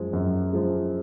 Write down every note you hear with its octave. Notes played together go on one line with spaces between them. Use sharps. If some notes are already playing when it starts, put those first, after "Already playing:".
Already playing: F#2 F3 G#3
F#2
F3 G#3